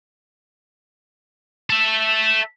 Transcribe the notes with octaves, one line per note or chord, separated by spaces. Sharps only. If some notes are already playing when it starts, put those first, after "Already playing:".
A4 E5